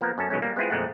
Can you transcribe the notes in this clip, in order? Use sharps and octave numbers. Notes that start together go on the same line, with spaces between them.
F3 A#3 B3 A#4
F#2 C#4 A4 A5
B2 D#3 F#3 G#3 A3 C#4
G3 A#3
G#3 B3 C4 E4 F4 G#4
F2 A#2 G#3 A3 C4 F#5